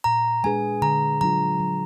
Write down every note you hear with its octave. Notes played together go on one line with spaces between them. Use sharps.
A#2 A#5
G#3 D4 G#4 B4 G#5
D3 A#5
F#3 D4 F4 A#5
F#3